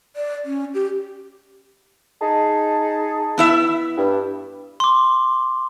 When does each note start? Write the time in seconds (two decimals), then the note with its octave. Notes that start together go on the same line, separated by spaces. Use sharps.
0.16 D5
0.45 C#4
0.74 G4
2.22 D#4 G#4 A5
3.38 B3 E4 E5
3.98 G2
4.80 C6 D6